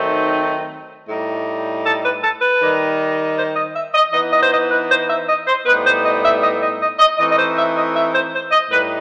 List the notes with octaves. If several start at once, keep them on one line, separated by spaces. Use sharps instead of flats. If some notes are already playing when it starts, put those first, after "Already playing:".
Already playing: D#3 F#3 A3 C4 D#4
A2 G3 D#4
A4
B4
A4
B4
D#3 G3 D#4
C5
D#5
E5
D#5
E3 B3 D#4 D#5
D#5
C5
D#5
B4
C5
E5
D#5
C5
A2 G3 B3 D#4 B4
C5
D#5
E5
D#5
D#5
D#5
D#5
E3 A3 C4 D#4 D#5
D#5
C5
E5
D#5
E5
C5
C5
D#5
A2 G3 D#4 B4